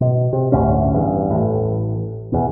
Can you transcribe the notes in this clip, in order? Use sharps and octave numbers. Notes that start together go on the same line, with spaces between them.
B2
C3
G1 D2 A2 C#4
E2 G2
A1 A2
E2 B2